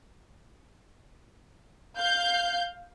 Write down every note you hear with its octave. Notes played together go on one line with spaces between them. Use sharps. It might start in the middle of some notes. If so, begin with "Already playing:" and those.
F5 G6